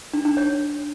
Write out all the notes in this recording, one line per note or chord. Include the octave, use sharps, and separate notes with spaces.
D4
D4
C#5